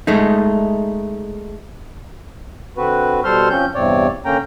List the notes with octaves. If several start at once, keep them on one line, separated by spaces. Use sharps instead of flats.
G#3 A3 D#4
D3 C4 F#4 B4
B2 G3 A4 C5 C6 F6
F3 C4 C#4 G6
E2 G2 C3 C4 C#5 D5
D3 A#3 C#4 G5 A#5